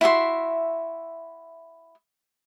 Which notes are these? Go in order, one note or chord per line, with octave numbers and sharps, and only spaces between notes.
E4 F#4 E5 C6